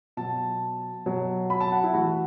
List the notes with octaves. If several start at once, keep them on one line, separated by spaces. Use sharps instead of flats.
B2 F#3 A5
B2 F#3
B5
A5
F#5
E4
A2 E3 F#4